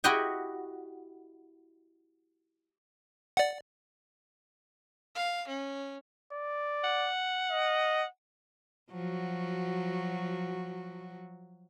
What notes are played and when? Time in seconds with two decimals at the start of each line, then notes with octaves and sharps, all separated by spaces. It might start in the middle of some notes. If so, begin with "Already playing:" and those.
0.04 E4 F#4 G4 D#5 F#5 G5
3.37 D5 F#5
5.15 F5
5.48 C#4
6.33 D5
6.84 F#5
7.52 D#5
8.91 F3 F#3 F#4